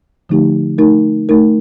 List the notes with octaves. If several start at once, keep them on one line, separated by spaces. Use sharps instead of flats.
D3 F3 A3 D#4 G4
A3 D#4 A#4
A3 D#4 A#4